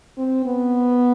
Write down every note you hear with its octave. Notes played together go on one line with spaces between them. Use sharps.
C4
B3